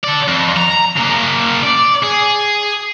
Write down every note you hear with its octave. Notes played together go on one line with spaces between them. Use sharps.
A4 D5
F2
A#5
C#3 A#3
D5
G#4